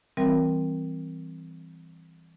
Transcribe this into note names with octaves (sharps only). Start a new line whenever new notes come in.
E3 G3 C4 A#4